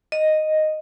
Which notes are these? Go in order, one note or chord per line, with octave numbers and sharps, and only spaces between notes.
D#5